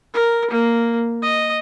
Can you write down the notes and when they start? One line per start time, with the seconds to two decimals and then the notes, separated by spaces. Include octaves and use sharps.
0.14 A#4
0.51 A#3
1.22 D#5